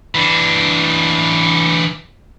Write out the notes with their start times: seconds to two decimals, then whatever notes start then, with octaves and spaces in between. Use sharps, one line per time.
0.15 E3 D4